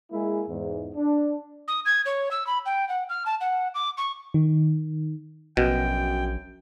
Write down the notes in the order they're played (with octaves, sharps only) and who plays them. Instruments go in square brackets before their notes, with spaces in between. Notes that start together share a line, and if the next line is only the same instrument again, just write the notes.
[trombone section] G#3 A#3 E4 G#4
E2 G#2
D4
[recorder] D#6
G#6
C#5
E6
B5
G5
F#5
F6
A5
F#5
D6
C#6
[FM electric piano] D#3
[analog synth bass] A#1 [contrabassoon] F#2 [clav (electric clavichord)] B2 [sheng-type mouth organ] G5